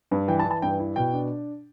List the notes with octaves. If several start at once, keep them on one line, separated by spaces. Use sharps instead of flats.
G2
E3 G5
A5
E3
A5
G2 G5
E4
B2 G5
D4